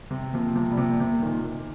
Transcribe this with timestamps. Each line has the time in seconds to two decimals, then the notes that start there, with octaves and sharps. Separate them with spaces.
0.11 C3
0.33 C3 F3 A#3
0.56 C3 F3
0.71 G3
0.78 C3 F3
1.00 C3
1.22 A#2 D#3